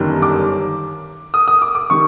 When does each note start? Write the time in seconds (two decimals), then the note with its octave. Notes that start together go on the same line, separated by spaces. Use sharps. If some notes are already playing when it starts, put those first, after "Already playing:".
Already playing: G1 F#2 D#3 G3
0.22 D6
1.34 D#6
1.48 D#6
1.62 D6
1.75 D6
1.90 D#3 G3 C#6